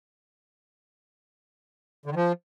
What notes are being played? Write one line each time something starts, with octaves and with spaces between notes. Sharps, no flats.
D3
D#3
F3